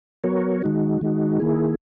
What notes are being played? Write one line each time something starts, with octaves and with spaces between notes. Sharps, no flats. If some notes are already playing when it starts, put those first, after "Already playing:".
F#3 B3 F#4 A#4 C#5
D#3 G#3 D#4 F#4
D#3 G#3 D#4 F#4
D#3 A#3 E4 G#4